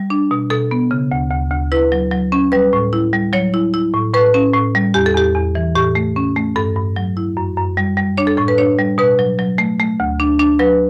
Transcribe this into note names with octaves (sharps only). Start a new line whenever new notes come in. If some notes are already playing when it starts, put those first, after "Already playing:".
Already playing: G3
D4
B2
B2 A4
B3
C#3
D2
D2
D2
E4 B4
F#3
F#3
C#4
G3 B4
A2
E4
G3
F#3 C#5
E4
E4
A2
A2 B4
C#4
A2
G3
E2 G4
A4
E2 G4
E2
E3
A2 G4
A3
C#4
A3
G2 A4
G2
F#3
E4
F#2
F#2
G3
G3
D4 C#5
A4
A2 A4
B4
D4 C#5
G3
B2 B4
F#3
F#3
A3
A3
D2
D4
D4
F#3 B4